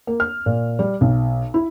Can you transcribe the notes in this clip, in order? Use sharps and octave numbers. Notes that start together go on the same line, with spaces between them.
A#3
F6
A#2
G3
B1
E4